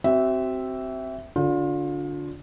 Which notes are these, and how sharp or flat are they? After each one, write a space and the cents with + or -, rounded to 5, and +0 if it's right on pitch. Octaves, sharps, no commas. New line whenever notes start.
C4 +0 F#4 +40 E5 -5
D3 -20 F4 +30